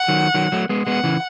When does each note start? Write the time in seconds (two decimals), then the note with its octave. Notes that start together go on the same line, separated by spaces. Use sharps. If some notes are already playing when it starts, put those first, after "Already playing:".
Already playing: F#5
0.08 D#3 F#3
0.34 D#3 F#3
0.52 F#3 A3
0.69 G#3 B3
0.87 G#3 B3 F#5
1.04 C#3 E3